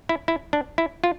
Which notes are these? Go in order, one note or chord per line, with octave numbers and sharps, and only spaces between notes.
E4
E4
D4
E4
F4